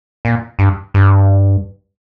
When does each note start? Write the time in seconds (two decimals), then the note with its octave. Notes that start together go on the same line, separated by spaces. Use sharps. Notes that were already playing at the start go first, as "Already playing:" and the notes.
0.25 A#2
0.59 G2
0.94 G2